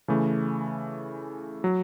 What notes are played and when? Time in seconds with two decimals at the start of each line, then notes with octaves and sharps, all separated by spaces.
0.08 C#3 E3 A3
1.64 F#3